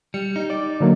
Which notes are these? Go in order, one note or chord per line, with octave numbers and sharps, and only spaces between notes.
G3 C#7
D#4
D5
D3 F#3 A#3